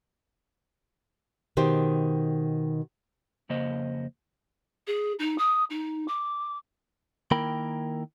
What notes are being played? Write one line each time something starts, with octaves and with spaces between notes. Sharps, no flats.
B2 D#3 G4 C5
F2 C#3 A#3 C5 D#5
G#4
D#4
D#6
D#4
D6
D#3 A#3 E4 A#4 G5 B5